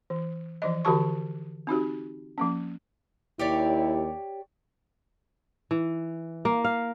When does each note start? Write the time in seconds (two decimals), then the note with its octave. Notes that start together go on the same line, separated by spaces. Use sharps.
0.10 E3
0.62 E3 F3 D#5
0.85 D3 E3 F#4 G4 A5 C#6
1.67 C4 D#4 F#4 G4
2.38 F3 A#3 C#4
3.39 D#2 E4 G4 C#5 D5
5.71 E3
6.45 A#3
6.64 F5